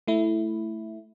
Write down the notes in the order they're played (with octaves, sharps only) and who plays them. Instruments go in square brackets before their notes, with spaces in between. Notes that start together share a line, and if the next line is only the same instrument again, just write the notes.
[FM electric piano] A3 E4